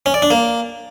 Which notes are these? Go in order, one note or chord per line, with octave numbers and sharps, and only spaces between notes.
C#4
D5
D4
A#3